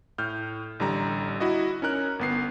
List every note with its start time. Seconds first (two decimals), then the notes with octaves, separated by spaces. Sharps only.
0.18 A2 F6 G6
0.80 A1 D3 G3 A#5
1.40 E4 F#4 D#5
1.82 C#4 D#4 A#4 F#6
2.19 G1 B3 C7